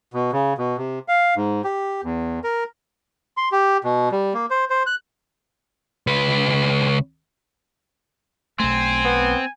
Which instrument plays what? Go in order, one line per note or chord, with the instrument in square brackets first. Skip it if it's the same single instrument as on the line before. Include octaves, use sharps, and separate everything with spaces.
[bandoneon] B2
C#3
B2
C3
F5
G#2
G4
E2
A#4
C6
G4
B2
G3
A#3
C5
C5
F#6
[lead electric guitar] C#2 B4
[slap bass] B1 A3 [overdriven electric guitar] C4 [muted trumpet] G#5
[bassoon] B3